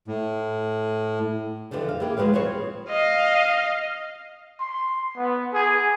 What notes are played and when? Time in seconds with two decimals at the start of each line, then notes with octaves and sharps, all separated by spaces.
0.08 A2
1.71 F2 D3 E3 F3 D4
1.89 F5
2.00 A#3 E4 G4 G#4
2.17 D2 F3 G#3 B4 C#5 F5
2.33 D#2 F3 G3 C4 C#5
2.90 D#5 F5
4.60 C6
5.17 B3
5.53 G#4